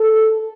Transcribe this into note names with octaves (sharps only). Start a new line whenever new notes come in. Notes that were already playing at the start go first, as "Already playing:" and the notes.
Already playing: A4